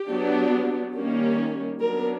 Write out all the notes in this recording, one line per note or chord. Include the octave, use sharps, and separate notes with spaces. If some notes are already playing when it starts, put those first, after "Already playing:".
Already playing: G4
F#3 B3 D4
D#3 G3 A#3 C#4
F#3 B3 D4 A#4